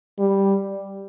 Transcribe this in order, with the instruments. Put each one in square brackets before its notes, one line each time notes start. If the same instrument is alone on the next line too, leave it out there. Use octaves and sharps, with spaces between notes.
[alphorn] G3